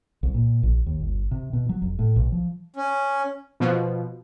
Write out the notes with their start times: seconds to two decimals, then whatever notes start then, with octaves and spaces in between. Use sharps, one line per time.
0.23 C2
0.34 A#2
0.63 A#1
0.86 D#2
1.00 G1
1.31 C3
1.53 B2
1.69 F#3
1.82 F1
1.99 A2
2.16 B1
2.32 F3
2.76 C#4
3.60 B2 F3